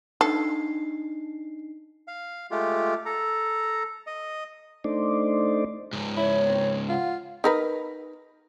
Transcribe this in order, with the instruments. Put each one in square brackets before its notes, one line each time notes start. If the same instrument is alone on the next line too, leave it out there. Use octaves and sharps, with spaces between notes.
[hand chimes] D4 D#4 C7 [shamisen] A4
[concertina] F5
G#3 A3 F4 G4
A4 A#5
D#5
[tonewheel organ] A3 D4 D#4 C5 D5
[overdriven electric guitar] C#2 G#2
[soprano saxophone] E4 [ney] C#5
[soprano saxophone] C4
[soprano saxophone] F4 [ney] F#5
[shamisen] D#4 A#4 B4